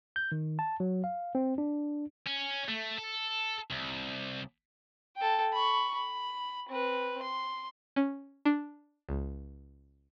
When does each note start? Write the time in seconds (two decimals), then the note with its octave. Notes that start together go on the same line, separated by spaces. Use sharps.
0.16 G6
0.32 D#3
0.59 A5
0.80 F#3
1.04 F5
1.35 C4
1.58 D4
2.27 C#4
2.69 A3
2.98 A4
3.70 C2
5.17 A4 G5
5.53 B5 C#6
5.95 B5
6.69 C4 B4
7.23 C6
7.96 C#4
8.45 D4
9.09 C#2